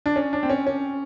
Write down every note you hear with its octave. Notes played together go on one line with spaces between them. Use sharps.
D4
C#4
D4
C4
C#4
C#4